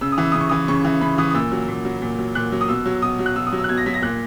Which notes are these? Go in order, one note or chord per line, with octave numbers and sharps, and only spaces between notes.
C#3 E6
D#6
E3
E6
C#3 D#6
C#6
E3 D#6
C#3 C#6
E3
C#3 B5
E3 D#6
D#6
A#2 E6
F#3
A#2
F#3
A#2
F#3
A#2 F#6
F#3
D#6
B2 E6
F#3
B2 D#6
F#3
F#6
B2 E6
D#6
F#3
E6
F#6
B2 G#6
A#6
F#3 B6
A#6
A#2 F#6